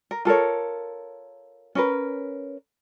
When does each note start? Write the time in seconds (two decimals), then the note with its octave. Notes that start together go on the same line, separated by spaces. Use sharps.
0.11 A#4
0.25 F4 A4 A#4 C#5
1.75 C#4 A#4 B4